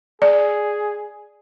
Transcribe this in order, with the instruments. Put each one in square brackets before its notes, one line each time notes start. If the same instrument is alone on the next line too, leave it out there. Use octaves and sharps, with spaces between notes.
[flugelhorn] G#4 [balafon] D5